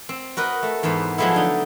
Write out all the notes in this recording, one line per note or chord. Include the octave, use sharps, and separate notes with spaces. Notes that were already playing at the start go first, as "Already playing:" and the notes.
C4
F#4 A#4 B4 D#5
A3
E2 G#2 B3 C5
F3 F#3 G#3 A3 B3 E4
D3 D#4